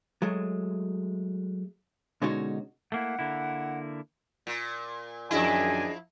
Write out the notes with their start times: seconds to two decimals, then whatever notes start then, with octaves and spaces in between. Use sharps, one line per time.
0.22 F#3 G#3 A3
2.22 B2 D3 G#3 C#4 D#4 F#4
2.92 A3 A#3 E4 F#5
3.19 D3 A#3 E4
4.47 A#2
5.31 F#2 D#3 F3 D4 E4 G#4 D#5 G#5